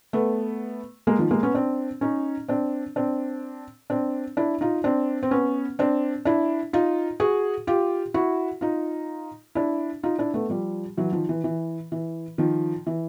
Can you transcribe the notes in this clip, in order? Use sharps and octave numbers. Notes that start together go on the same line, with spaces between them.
A3 B3
G#3 A#3
D#3 F3
G#3 A#3
B3 C#4
C4 D4
C#4 D#4
C4 D4
C4 D4
C4 D4
D4 E4
D#4 F4
C4 D4
C4
B3 C#4
C4 D4
D4 E4
D#4 F4
F#4 G#4
F4 G4
E4 F#4
D#4 F4
D4 E4
D#4 F4
D4 E4
A3 B3
F3 G3
E3 F#3
D#3 F3
E3
E3
E3
D#3 F3
E3